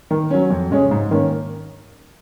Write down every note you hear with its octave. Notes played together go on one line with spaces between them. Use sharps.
D#3
F#3 C#4
F2
C#3 G#3 C#4
G#2
D#3 A#3 C#4